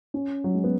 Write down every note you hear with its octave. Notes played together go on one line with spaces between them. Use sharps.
C#4
F#3
G#3
B3